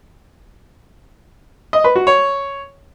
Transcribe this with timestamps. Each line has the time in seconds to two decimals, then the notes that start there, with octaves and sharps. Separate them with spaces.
1.73 D#5
1.84 B4
1.96 F#4
2.07 C#5